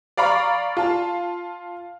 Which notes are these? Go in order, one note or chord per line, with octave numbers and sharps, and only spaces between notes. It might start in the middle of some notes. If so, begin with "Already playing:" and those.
D5 F5 A#5 B5 C#6
F4 A5